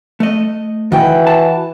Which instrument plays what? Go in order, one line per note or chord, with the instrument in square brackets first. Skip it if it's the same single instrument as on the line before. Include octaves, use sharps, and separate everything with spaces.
[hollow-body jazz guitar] A3 D#5
[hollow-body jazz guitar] D#3 [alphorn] E3 [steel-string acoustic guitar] F#4 B4 G5
[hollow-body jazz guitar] A5